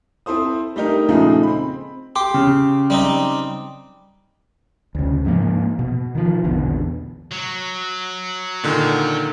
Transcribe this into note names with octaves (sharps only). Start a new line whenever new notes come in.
C4 E4 A4 C5 D#6
G3 A3 D4 D#4 G4 A#4
A#2 C#3 F3 G#3 A3 D#4
C4 B5
G4 G5 C6 D6
C#3
G3 C4 D#4
D2 C#3
G#2 F3 G#3 A#3
B2
D#3 F3
A#1 E2 B2 D3
F#3
A#2 D3 D#3